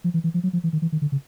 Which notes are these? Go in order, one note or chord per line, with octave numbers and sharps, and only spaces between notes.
F3
E3
E3
F3
F#3
F3
E3
D#3
E3
D#3
D3
C#3